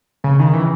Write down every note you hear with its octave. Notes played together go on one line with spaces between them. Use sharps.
C#3
D#3
E3